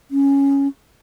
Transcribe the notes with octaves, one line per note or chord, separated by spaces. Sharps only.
C#4